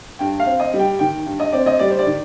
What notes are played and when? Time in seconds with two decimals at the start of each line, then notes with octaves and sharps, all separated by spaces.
0.19 G2 G5
0.40 F5
0.46 C4
0.60 D#5
0.74 G3
0.79 G5
0.99 D#3 G5
1.26 G2
1.40 D#5
1.52 C4 D5
1.66 D#5
1.79 G3 D5
1.90 C5
1.99 D5
2.06 D#3